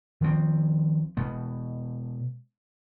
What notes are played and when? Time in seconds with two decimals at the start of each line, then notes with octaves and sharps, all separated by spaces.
0.21 D#3 F3 A#3 C4
1.17 B2 G#3 B3